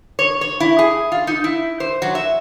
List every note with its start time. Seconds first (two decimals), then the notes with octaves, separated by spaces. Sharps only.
0.19 C#5
0.41 C#5
0.60 E4
0.79 G#4
1.12 F4
1.27 D#4
1.44 E4
1.80 C5
2.02 F#3
2.15 E5